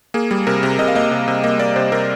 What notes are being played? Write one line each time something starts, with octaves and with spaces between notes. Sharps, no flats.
A#3 G#4
G3
C3 A#4
C3
C3 D#5
F5
A#3 D#5
C3
C3
A#3 D#5
A#3 D5
C3 C5
C3 A#4